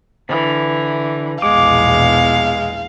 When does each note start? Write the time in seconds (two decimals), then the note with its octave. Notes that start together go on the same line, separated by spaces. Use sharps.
0.29 D3 E3
1.42 A#1 E2 B2 G#3 F5 D6